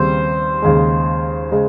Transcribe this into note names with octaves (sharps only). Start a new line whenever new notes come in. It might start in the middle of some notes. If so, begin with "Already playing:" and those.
Already playing: D#2 C#3 G3 C4 C5
D#2 C#3 G#3
C#3 G#3